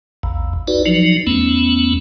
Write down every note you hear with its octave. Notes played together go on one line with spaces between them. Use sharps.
A#1 E2
D#4 F#4 B4 D5
F3 F#3 D#4
E2 A3 B3 C#4